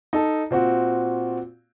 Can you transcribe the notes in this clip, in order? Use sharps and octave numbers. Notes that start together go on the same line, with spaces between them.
D#4 A4 A5
A#2 C4 F#4